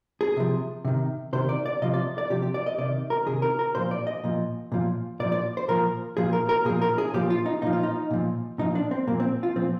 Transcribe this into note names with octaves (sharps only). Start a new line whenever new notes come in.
G#4
C3 F3
C3 D#3
C3 D#3 C5
D5
D5
C3 F3 D#5
D5
D5
C3 F3 G4
G4
D5
D#5
C3 D#3 D5
A#4
C3 D#3 G#4
A#4
A#4
A#2 F3 C5
D5
D#5
A#2 F3
A#2 F3
A#2 F3 D5
D5
C5
A#2 F3 A#4
A#2 F3 G#4
A#4
A#4
A#2 F3 G#4
A#4
G#4
A#2 F3 G4
F4
D#4
A#2 F3 D#4
F4
D#4
A#2 F3
A#2 F3 D#4
D4
C4
A#2 F3 A#3
C4
F4
A#2 F3 C4